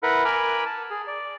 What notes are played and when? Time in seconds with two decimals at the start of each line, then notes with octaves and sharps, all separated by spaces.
0.03 E4 A#4 B4 F#5
0.25 A#4 G#5 B5 D6 F6
0.65 A5
0.90 G#4
1.07 D5